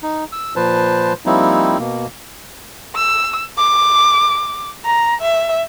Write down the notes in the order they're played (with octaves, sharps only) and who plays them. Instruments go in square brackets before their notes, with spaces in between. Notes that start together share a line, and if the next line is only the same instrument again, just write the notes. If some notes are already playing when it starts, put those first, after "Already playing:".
[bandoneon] D#4
E6
A#2 F3 B4 C5 A5
F3 G3 A#3 C4 D#4 E4
B2 A#3
[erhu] E6
D6
A#5
E5